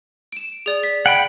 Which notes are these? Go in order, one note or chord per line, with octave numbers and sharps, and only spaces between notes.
D7 E7
G#4 D5
B6
F#5 G5 B5